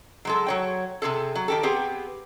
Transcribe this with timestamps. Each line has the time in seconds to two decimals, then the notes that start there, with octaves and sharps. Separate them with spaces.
0.25 F#3 G#3 A4
0.47 F#3 C#5 G5
1.02 C3 F4 G#4 A4
1.35 F#3
1.48 D#3 G4 A4
1.63 B3 C4 G4 G#4